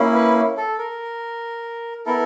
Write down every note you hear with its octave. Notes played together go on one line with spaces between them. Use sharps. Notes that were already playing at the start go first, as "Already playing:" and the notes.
Already playing: A#3 C#4 E4
B4
A4
A#4
B3 E4 A4 A#4